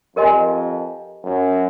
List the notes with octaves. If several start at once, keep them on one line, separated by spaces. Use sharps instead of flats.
F2 G4 A#4 D#5 G#5 C6
F#2